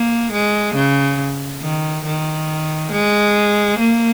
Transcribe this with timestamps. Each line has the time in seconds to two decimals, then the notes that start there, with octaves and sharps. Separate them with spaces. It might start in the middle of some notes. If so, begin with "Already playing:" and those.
Already playing: A#3
0.32 G#3
0.75 C#3
1.62 D#3
2.05 D#3
2.92 G#3
3.79 A#3